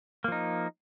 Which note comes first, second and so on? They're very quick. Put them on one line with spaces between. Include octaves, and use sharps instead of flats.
A#3 F3 D#4